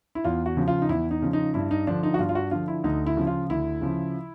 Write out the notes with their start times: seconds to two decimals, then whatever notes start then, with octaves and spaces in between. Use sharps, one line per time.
0.15 E4
0.24 E2 F4
0.46 F#4
0.57 C#3 F3
0.68 F4
0.82 D#4
0.89 E2 E4
1.11 D#4
1.22 C#3 F3
1.33 D#4
1.54 G2 E4
1.71 D#4
1.87 D3 F3 D4
2.03 D#4
2.14 F#4
2.19 G2 F4
2.29 F4
2.35 F#4
2.51 D3 F3 F4
2.68 E4
2.84 D2 D#4
3.07 E4
3.17 C#3 F3
3.27 F4
3.50 D2 E4
3.81 C#3 F3